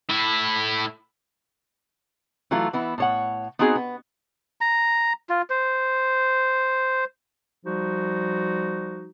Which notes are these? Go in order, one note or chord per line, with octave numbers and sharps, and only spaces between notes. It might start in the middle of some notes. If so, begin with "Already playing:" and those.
A2 E4
E3 F#3 A3 E4 F4
E3 B3 E4
A2 C#5 F#5
B3 C4 D#4 F#4 G#4 C5
B3
A#5
F4
C5
F3 G3 D#4 F#4